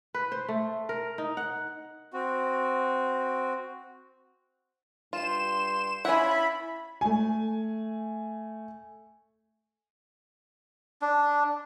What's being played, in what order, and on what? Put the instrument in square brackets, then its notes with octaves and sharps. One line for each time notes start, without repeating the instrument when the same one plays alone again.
[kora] B4
C5
A3
A#4
D#4
F#5
[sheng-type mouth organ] C4 F#4
[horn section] G2 G5 C6 [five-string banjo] F4 [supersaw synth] E7
[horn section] C#4 F4 C#5 [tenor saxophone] E4 [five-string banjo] F#5 G#5 [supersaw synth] B5
[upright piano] A3 G#5
[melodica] D4